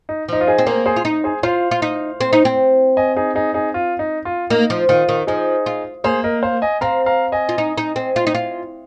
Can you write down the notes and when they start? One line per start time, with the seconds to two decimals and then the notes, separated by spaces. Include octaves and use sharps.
0.09 D#4
0.28 F3 D#4
0.41 F4
0.47 D#4 G#4
0.58 C4
0.67 A#3 G#4 C5
0.86 G#4 C5
0.96 F4
1.05 D#4
1.24 G#4 C5
1.43 F4 C5 F5
1.71 F4
1.82 D#4
2.20 C4
2.33 D#4
2.45 C4
2.97 D#5 G#5
3.17 D#4 G#4
3.35 D#4 G#4
3.54 D#4 G#4
3.74 F4
3.99 D#4
4.25 F4
4.50 A#3 D#4
4.70 F3
4.89 D#3 F4
5.09 D#3
5.27 F3 D#4 G#4
5.66 F4
6.04 A#3 G#4 C5
6.24 A#4 D#5
6.42 C5 F5
6.62 D#5 G#5
6.81 C4 F5 A#5
7.06 F5 A#5
7.32 D#5 G#5
7.49 F4
7.58 D#4
7.78 D#4
7.96 C4
8.16 F4
8.27 D#4
8.35 F4